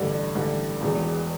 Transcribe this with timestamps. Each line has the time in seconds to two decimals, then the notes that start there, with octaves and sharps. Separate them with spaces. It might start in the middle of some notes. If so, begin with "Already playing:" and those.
Already playing: A1 G2 D3 G3
0.35 A1 G2 D3 G3
0.81 E1 E2 B2